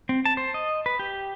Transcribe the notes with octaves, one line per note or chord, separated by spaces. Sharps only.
C4
A5
C5
D#5
B4
G4